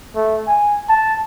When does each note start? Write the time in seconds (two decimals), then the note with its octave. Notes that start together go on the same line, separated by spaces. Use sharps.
0.15 A3
0.47 G#5
0.89 A5